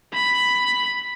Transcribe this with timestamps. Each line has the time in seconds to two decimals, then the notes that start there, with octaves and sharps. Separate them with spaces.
0.13 B5